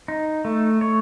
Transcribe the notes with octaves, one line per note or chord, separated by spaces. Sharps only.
D#4
A3
C#5